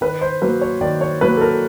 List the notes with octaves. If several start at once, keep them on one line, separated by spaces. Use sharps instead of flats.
D#3 B4
C5
F#3 A#3 B4
C#5
D#3 D5
C#5
F#3 A#3 B4
A4
A#4